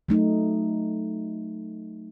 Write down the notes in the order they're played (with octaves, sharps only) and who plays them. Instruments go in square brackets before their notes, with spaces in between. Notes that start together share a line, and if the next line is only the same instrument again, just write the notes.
[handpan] F#3 A3 D#4